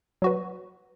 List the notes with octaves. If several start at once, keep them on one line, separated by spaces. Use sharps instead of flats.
F#3 F#4 B4